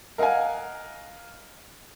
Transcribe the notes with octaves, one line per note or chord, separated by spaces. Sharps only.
A#4 D#5 F5 F#5 G#5